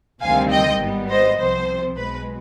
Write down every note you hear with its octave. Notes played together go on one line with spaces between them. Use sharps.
D2 C3 D#3 G3 C4 F5 G#5
D#5 G5
G#1 G#2 G3 B3
C5 D#5
C2 C3 F3 C5
B1 B2 G#3 B4